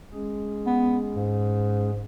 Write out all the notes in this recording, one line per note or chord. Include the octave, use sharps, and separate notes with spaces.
G#3 C#4 G#4
B3
G#2